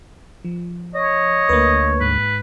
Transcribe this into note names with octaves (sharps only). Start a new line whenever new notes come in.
F3
C#5 D#5
D2 A#3 B4
G#2 B4